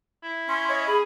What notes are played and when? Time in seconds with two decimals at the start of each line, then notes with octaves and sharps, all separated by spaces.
0.24 E4
0.49 C#4 C6
0.69 C#5 D#5
0.87 G#4 B5